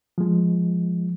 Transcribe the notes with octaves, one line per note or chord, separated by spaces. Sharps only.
F3 G#3